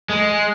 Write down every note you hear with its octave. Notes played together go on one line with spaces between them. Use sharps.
G#3